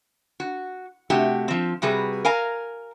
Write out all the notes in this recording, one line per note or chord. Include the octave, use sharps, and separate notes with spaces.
F#4
C3 A3 F#4 G4
F3 C4
C3 G3 F#4 G#4 B4
A#4 F5 G#5 A#5